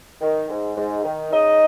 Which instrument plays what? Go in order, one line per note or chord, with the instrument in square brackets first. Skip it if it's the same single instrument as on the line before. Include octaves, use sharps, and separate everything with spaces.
[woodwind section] D#3
G#2
G#2
D#3
C#3 D#4 D#5